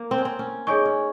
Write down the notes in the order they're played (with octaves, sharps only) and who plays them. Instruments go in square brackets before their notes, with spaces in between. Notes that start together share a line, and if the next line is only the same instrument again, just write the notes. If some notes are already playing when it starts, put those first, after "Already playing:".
Already playing: [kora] A#3
C4
C#4
C4
C#4
[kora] D#4 [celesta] G#4 C#5 G#5 C#6
[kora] C#4